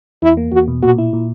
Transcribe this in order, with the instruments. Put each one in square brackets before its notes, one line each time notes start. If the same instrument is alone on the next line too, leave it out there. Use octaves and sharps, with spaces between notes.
[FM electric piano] E2 [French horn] E4
[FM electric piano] A#3
[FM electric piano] E2 [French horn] F#4
[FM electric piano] B2
[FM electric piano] A#2 [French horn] F#4
[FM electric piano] E4
A#2